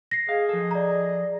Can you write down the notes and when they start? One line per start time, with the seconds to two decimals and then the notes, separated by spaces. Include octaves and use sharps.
0.11 A#6 C7
0.29 G#4 D#5 F5
0.49 F3 A4
0.71 D5 A#5